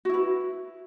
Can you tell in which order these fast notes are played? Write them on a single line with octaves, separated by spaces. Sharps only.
F#4 E4 B4